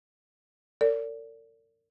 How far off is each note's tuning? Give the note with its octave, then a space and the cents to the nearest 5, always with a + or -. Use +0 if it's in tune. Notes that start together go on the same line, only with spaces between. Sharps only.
A#4 -40 D5 -30